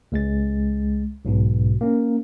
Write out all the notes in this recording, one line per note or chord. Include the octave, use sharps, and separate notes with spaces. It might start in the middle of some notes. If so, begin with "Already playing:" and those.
C#2 G#3 A6
B1 G#2 B2
A#3 C#4